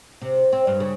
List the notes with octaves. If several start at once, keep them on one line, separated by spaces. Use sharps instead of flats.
C3
C4
G2
C#3